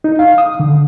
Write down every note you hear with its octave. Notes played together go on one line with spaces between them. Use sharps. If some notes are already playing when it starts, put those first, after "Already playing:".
D#4
F5
D#6
D3